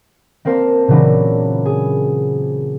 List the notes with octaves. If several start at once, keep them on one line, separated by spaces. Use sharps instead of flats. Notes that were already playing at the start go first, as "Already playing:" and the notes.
A#3 C4 A#4 C5 F5 A5
A#2 C#3 E3 F#3 D4 E4
G#4